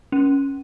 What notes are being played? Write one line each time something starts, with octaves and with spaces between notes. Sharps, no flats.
C#4